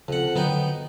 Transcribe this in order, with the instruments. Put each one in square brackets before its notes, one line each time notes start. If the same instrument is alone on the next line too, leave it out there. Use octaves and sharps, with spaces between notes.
[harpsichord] F2 F#5 [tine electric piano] C#3
[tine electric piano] D3 F#3 [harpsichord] B3 D#4 G5